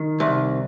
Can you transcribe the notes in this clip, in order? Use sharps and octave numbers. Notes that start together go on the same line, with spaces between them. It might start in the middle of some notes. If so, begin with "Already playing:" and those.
Already playing: D#3
C2